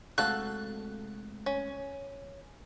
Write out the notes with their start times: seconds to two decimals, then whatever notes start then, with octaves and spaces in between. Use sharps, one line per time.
0.18 C3 G#3 A3 F#4 A4 F5 F#6
1.46 C#4